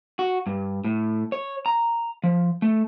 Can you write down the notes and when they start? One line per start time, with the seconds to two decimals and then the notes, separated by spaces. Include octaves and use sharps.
0.19 F#4
0.47 G2
0.84 A2
1.32 C#5
1.66 A#5
2.24 F3
2.62 A3